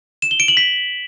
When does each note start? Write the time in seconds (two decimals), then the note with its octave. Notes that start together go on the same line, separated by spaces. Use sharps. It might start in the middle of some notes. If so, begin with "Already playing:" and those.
0.22 E7
0.31 G7
0.40 D7
0.48 F#7
0.57 B6